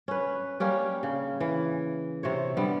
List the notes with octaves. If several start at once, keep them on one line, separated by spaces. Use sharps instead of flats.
C#4 B4
G3 A#3 C#4 G4
C#3
E3
C3 C5 C#5
D3 G3 B3